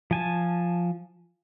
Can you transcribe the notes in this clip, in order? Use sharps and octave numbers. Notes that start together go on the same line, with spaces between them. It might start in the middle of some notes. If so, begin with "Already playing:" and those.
F3 G#5 A5